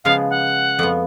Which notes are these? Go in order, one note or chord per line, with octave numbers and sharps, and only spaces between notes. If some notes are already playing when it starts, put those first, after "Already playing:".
C#3 F3 G#3 B3 F5
F#5
F2 F3 B3